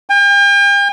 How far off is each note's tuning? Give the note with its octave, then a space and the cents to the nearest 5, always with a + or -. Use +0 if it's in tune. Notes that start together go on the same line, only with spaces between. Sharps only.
G5 +45